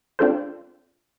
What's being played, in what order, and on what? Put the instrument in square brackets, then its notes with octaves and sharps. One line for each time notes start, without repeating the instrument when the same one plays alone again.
[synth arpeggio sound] C4 D4 F4 A4 C5